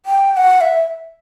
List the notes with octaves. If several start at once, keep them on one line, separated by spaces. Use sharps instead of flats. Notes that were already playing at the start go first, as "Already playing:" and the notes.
G5
G5
F#5
E5